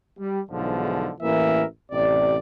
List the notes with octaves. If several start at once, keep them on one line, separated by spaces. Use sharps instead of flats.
G3
B1 E2 G#2 D3 F3
A1 E3 A#3 A#4 E5
A1 C3 D5